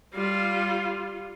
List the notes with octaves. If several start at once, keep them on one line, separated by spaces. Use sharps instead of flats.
G3 F4